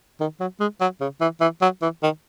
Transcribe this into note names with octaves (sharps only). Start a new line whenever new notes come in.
D#3
F#3
G#3
F#3
C#3
E3
E3
F#3
E3
D#3